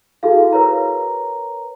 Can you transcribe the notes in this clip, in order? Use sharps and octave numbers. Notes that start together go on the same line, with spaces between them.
E4 F#4 G#4 A4 F5
A#4 B4 C#5 A#5